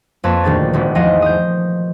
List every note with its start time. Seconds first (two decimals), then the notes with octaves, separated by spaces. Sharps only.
0.24 F2 A#3 B4 A5 C#6
0.44 D2 A#2 D#3 G#4 A6
0.73 D#1 G#1 B3
0.95 E2 F3 D#5 F5 F#5 D#7
1.22 D#6 G6